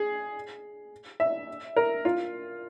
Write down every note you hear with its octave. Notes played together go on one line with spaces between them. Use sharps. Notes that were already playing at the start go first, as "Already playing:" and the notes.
Already playing: G#4
E5
A#4
F4